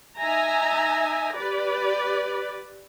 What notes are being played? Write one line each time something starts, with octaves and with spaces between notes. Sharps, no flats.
D#4 E5 G#5 A#5
G4 B4 D5